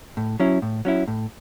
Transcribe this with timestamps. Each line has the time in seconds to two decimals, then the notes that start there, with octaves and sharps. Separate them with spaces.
0.17 A2
0.40 F#3 C#4 E4
0.62 A2
0.85 F#3 C#4 E4
1.08 A2